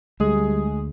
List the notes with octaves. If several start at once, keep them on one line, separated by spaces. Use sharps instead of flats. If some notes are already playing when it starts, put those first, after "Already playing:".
D2 G3 G#3 G#4